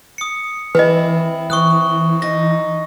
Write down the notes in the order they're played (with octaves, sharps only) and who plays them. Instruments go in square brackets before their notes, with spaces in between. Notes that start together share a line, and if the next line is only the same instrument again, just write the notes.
[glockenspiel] D#6 C#7
[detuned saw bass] E3 [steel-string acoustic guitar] C4 E4 [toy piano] B4 D#5
[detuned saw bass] E3 [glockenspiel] C#6 D#6 F#6
[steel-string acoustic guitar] D#4 [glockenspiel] A#6